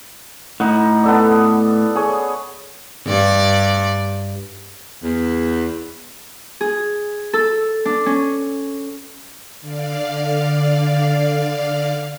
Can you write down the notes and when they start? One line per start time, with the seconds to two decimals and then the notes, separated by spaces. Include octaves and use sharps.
0.60 A2 D#4 F#5
1.03 B3 A4 D5
1.95 G#4 C#5
3.06 G2 D5
5.03 E2
6.61 G#4
7.33 A4
7.85 D4
8.06 C#4
9.61 D3 D5 F5